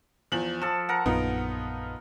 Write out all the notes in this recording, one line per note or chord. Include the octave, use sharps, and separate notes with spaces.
E2 F3 F#7
F3 A4 E7
A#4 F#5
A#1 F#2 B3 D#4 F4